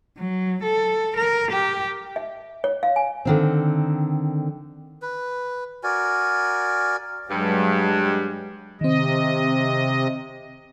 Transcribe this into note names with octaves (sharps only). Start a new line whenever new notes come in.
F#3
A4
A#4
G4
E5
C#5
F5
G#5
D3 D#3 C4
B4
F#4 A#4 D5 G#5
G2 F#3 G#3
C3 D#3 C4 D#5